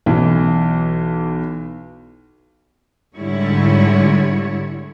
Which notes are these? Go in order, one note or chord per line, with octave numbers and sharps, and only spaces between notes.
B1 E3
G#2 D3 G3 E4 C#5